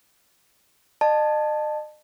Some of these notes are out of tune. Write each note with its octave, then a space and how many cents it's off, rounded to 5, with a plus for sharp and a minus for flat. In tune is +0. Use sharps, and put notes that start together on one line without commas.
D#5 -40 A5 +0